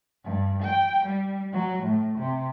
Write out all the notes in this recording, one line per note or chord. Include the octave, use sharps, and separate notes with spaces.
G2
G5
G3
F#3
A2
C3